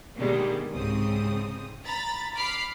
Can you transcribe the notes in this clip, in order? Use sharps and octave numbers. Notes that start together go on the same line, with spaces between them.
B2 D3 D#3 G3 G#3 A#3
C2 G#2 C#3 C4 D#6
A#5 B5 A6
B5 D6 F6 C7